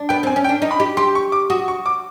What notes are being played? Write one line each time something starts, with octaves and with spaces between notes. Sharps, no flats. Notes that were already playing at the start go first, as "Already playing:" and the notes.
Already playing: D4
B3 G5
C4 G#5
C#4
G5
D4
D#4
B5
G4
G4 C6
C#6
D6
F#4 D#6
C#6
D6